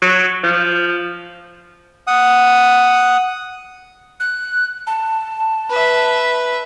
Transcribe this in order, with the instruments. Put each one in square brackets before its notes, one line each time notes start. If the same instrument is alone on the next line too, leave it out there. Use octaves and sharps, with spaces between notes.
[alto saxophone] F#3
F3
[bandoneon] F#5 D#6
[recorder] F#6
A5
[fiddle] B4 E5